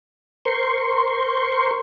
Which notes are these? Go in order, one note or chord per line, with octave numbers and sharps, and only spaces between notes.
A#4 C5 C6 C#6